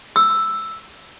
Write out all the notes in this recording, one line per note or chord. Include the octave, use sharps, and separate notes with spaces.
E6